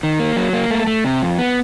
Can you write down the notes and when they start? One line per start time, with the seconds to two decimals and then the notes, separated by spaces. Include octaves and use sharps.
0.03 D#3
0.19 A#3
0.36 F#3
0.53 A#3
0.71 A3
0.87 A3
1.04 C3
1.22 F2
1.39 B3